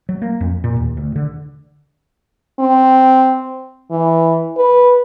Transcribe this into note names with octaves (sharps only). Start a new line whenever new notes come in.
F#3
A#3
F2
A#2
D#2
D2
D3
C4
E3
B4